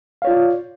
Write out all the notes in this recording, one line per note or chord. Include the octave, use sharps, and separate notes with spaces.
F4 C#5 D5 F5